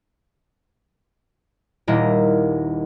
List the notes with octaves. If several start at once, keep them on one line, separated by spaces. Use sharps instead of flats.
D#1 A#3 E4 D#5